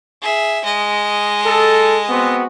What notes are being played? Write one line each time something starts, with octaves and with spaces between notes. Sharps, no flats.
G#4 E5
G#3 D#5
A4
B3 C4 F#4